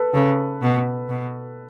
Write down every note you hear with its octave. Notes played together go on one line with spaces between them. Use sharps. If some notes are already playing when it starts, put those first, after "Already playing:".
Already playing: A4 B4
C#3 A4
B2
B2